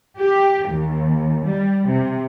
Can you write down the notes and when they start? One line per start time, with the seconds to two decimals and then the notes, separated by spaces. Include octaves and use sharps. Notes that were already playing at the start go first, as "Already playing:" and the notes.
0.18 G4
0.69 D#2
1.44 G3
1.90 C3